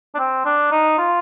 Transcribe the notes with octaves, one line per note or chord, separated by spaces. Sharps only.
D4
C4
D4
D#4
F4